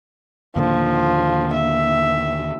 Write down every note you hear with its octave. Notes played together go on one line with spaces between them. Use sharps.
D#2 A#2 D3 F3
E5